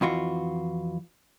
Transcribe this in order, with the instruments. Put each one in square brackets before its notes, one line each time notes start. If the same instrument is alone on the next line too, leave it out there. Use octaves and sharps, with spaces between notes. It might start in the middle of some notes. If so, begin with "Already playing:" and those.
[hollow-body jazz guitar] F2 E3 F4 F#4